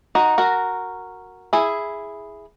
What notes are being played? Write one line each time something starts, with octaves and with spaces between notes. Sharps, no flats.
D#4 F#4
F#4 A#4
E4 G#4